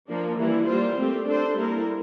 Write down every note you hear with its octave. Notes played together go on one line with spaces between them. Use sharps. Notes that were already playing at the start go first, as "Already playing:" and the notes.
F3 A#3 D4
E3 G3 A#3 E4
G3 A#3 F4 C5
A3 C4 G4
D4 A4 C5
G3 A#3 E4 A#4